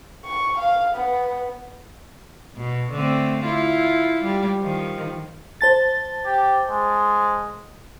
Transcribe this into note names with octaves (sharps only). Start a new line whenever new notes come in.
C#6
F5
B3
B2
D3 A3 C4
E4 F4
G3
D#3 F3
C5 A5 A6
G4
G#3